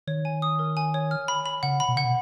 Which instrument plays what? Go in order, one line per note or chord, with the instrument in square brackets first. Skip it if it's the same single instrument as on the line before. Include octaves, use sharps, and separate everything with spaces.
[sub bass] D#3 [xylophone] C#5
[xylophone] G#5
D#6
A#4
G#5
C#5
F6
B5
B5
[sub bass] C#3 [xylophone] F#5
[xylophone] B5
[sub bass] B2
[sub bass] C#3 [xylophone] F#5
[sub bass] B2